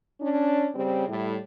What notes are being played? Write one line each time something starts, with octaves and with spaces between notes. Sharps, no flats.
C#4 D4
C#3 G3 C4
A2 G3